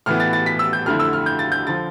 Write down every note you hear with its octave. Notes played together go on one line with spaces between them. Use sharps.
A2 E3 B3 F6
A6
A6
B6
E6
G6
F2 D3 A3 E4 F6
E6
F6
G6
A6
G6
D3 F3 A6